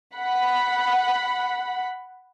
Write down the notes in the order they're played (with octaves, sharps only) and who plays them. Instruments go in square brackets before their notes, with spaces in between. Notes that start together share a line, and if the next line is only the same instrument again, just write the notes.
[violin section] F#5 B5